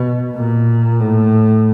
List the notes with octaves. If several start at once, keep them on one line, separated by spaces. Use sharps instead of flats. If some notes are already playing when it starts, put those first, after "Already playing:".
Already playing: B2
A#2
A2